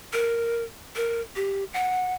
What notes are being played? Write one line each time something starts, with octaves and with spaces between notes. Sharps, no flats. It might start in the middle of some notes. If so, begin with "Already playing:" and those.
A#4
A#4
G4
F#5